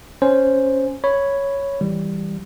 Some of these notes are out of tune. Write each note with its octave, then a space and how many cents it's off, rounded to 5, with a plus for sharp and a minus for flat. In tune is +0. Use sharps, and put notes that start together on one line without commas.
C#4 +0 C5 +0
C#5 +0 B5 +0
E3 -10 G3 +0